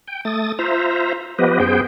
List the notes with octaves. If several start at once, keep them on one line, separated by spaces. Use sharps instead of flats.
G5
A3 D#6 A6
F4 C5 E5 A#5
F3 B3 G4 B4 D#5
F#2 B3 G#4 C5 G5